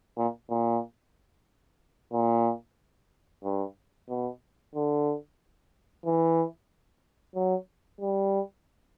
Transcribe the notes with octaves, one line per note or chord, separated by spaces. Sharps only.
A#2
A#2
A#2
G2
B2
D3
E3
F#3
G3